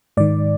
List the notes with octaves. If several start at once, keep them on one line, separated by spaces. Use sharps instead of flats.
G#2 D#3 D5